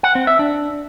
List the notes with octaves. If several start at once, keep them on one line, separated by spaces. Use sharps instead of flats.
F#5
C4
E5
D4